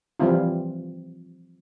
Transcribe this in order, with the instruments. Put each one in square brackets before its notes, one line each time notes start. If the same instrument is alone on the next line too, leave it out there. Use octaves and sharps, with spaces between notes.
[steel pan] E3 F3 G3 C4 E4 F4